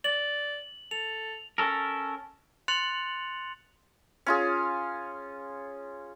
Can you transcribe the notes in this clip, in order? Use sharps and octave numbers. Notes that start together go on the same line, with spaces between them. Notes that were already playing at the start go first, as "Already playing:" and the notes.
D5 F#7
A4 F7
C#4 A4 A#4
C6 F#6 A6 C#7 F7 F#7
C#4 F4 G#4